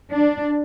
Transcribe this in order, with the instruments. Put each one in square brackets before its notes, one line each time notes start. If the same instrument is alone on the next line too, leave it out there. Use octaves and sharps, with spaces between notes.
[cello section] D4